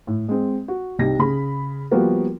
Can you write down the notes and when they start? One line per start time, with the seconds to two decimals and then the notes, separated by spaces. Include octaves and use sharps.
0.07 A2
0.28 G#3 C4
0.68 F#4
0.99 C2 C3 D#4 G4 A#6
1.19 C#3 G#4 B5
1.91 F3 G3 A#3 B3 F#4 A#4